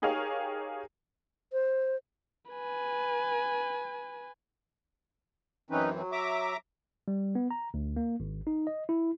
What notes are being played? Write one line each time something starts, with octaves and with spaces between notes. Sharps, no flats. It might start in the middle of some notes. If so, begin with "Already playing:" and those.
D#4 G4 G#4 A#4 C#5 F5
C5
B4 G#5
F#2 E3 C4 C#4 D#4 B4
F#3
E5 A#5 D6
G3
B3
A#5
D2
A#3
G#1
D#4
D#5
E4